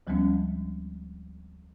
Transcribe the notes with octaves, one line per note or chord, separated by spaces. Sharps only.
D2 F3 G3 G#3 B3 C#4